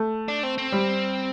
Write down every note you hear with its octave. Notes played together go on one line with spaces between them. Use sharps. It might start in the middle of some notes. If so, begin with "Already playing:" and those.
Already playing: A3
D4
C4
C4
G3